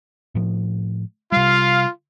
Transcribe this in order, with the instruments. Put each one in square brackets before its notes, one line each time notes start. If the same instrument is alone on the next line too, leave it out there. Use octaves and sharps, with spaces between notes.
[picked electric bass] A2 F3
[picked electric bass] C3 G3 [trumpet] F4 [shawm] F5